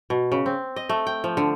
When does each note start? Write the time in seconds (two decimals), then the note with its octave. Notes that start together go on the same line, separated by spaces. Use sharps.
0.10 B2
0.32 C#3
0.46 C4
0.76 D#5
0.89 A3
1.07 G5
1.24 F3
1.37 D3